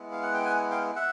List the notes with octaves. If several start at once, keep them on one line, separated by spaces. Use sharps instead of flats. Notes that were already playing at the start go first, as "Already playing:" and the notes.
Already playing: G#3 B3 E4
F5
F#5
G5
F#5 G#5
F5 G5
E5 F#5